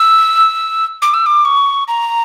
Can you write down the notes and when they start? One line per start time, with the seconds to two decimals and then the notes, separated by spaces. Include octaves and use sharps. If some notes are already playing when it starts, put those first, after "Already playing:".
Already playing: E6
1.02 D6
1.14 E6
1.26 D6
1.45 C#6
1.88 A#5